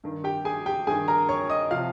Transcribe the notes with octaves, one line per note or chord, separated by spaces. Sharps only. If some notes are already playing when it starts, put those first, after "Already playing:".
G2 D#3
G4 G5
G#4 G#5
G4 G5
G2 D#3 G#4 G#5
A#4 A#5
C#5 C#6
D#5 D#6
C3 F3 F5 F6